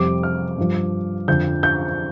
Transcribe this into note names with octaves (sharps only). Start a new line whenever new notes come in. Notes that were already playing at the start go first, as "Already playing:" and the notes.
Already playing: F2 C3 G3 D6
F6
G2 F3
F2 D3 F3 G6
G6